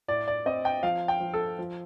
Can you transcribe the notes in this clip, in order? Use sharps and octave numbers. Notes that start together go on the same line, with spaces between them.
A2 D5
D5
C4 D#5
G5
F3 F5
G5
F3
A4
F3